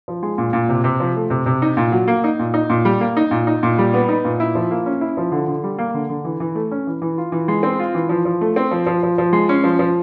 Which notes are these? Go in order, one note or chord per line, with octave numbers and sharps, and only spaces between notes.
F3
G#3
A#2
A#2
C3
C3
F3
A3
C3
C3
D#4
A#2
F#3
A#3
D#4
A#2
D#4
A#2
G3
A#3
D#4
A#2
D#4
A#2
G3
B3
D#4
A#2
E4
F3
A#3
C#4
E4
F3
D3
D3
G3
A#3
D3
D3
E3
E3
A3
C#4
E3
E3
F4
E3
G#3
C4
F4
E3
F3
F3
A3
C4
F3
F3
F3
F3
G#3
C#4
F3
F3